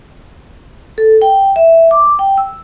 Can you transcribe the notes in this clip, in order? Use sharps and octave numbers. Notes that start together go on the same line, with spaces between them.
A4
G5
E5
D6
G5
E6